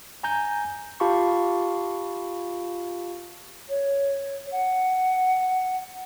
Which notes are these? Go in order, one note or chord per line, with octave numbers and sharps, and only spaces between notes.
G#5 A#5 G6
F4 G4 F5 A5 B5 C#6
C#5
F#5